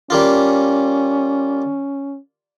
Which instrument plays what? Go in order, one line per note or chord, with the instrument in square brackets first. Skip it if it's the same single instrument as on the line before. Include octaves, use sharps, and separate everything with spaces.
[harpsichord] G3 A#3 F4 [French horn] C#4